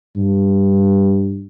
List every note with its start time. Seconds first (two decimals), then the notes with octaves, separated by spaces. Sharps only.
0.17 G2